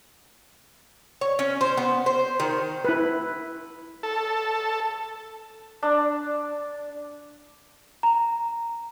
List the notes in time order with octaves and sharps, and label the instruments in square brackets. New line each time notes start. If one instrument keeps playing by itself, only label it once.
[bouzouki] C#5
C#4
C5
B3
C5
D#3
[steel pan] E4 B4
[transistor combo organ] A4
[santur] D4
[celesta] A#5